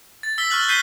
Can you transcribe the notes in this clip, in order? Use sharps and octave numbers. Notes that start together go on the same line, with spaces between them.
A6
E6 B6 G7
C#6 F6 F#6 F#7
F#6 G6 B6 C7 D#7 G7